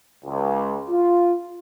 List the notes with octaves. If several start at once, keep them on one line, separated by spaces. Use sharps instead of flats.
C#2
F4